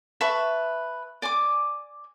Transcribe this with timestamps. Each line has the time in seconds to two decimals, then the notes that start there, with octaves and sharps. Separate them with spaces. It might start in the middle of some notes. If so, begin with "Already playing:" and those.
0.21 B4 E5 A5 C#6
1.22 D5 G#5 D6